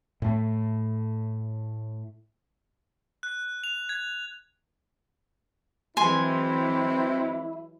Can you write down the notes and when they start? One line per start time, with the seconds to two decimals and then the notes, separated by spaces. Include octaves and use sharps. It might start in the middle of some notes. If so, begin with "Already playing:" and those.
0.22 A2 A3
3.23 F#6
3.64 F7
3.89 G#6
5.97 E3 F#3 G#3 C4 E4 G#5 C6